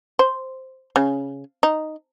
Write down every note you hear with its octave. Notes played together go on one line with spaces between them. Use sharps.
C5
C#3
D#4